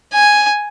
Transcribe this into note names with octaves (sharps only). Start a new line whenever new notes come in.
G#5